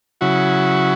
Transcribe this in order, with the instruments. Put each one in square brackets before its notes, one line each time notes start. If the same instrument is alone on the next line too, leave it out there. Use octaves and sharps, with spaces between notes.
[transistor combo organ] C#3 F#3 E4 F#4